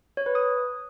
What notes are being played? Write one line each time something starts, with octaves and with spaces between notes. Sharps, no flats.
C#5
B4
D#6